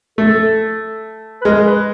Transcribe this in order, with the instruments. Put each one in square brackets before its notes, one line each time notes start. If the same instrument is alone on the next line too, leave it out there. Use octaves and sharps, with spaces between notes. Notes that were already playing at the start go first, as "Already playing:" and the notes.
[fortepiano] A3 [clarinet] A4
[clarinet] B4
[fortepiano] G#3 [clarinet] A#4
[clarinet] B4